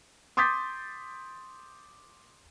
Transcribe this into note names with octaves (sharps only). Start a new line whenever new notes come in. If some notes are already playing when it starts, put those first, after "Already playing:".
C6 D6 D#6 G6 A6 B6